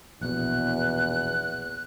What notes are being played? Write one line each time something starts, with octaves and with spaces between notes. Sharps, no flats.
A#1 E2 B2 F#6